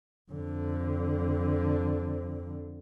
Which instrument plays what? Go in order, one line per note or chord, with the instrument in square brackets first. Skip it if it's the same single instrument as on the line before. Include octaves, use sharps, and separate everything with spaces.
[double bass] F2 D3